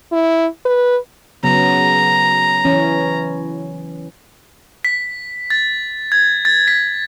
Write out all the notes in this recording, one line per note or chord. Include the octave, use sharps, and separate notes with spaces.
E4
B4
C#3 F#3 B3 A#5
E3 C#4
B6
A6
G#6
A6
B6